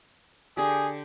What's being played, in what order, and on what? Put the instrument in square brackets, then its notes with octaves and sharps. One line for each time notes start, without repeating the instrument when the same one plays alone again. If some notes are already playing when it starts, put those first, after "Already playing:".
[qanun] D3 G4 [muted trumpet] G#4